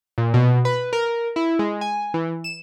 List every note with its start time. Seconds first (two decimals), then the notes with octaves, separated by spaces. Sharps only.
0.18 A#2
0.34 B2
0.65 B4
0.93 A#4
1.36 E4
1.59 G#3
1.81 G#5
2.14 E3
2.44 E7